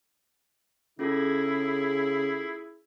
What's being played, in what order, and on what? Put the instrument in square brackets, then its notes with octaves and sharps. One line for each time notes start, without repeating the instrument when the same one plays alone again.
[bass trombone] C#3 [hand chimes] C#4 F4 A4 [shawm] E4 [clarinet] G#4